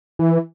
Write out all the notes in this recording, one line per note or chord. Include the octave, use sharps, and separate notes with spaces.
E3